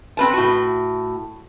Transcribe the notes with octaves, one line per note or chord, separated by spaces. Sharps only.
C4 B4 A5
A2 F#4